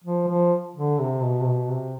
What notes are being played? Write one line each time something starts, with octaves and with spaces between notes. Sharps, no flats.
F3
F3
D3
C3
B2
C3
B2
C3